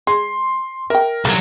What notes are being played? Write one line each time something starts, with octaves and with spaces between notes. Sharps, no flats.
G#3 C6
A#4 E5 G5
C2 F#3 A3